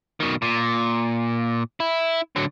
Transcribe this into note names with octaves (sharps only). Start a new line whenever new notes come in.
B2 D#3
A#2
E4
D3 F#3